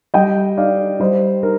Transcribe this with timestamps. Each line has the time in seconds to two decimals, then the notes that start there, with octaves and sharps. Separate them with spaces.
0.14 G3 D#5 G5
0.57 D#4 D5 F5
1.00 G3 C5 D#5
1.43 D#4 A#4